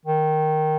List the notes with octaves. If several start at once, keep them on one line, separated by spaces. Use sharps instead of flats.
D#3